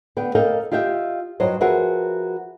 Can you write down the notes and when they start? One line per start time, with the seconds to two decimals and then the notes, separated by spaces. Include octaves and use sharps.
0.17 D3 B3 G5
0.35 A4 A#4 D#5 F5 G5
0.71 F4 G4 D#5 E5 G5
1.40 G2 F#3 C5 D#5
1.61 F3 F#4 G#4 A#4 B4 E5